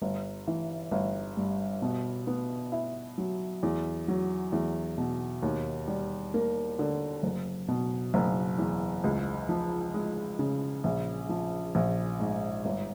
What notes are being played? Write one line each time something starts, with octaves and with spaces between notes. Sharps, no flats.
G1
E3
G1
G2
B2
B3
E4
F#3
E2
F#3
E2
B2
D#2
G3
A#3
D3
F#1
B2
F#1
E2
C#2
F3
G#3
C#3
A#1
F3
A#1
G#2
G1